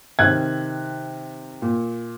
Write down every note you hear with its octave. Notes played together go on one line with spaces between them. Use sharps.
C3 D#3 F#6 G#6
A#2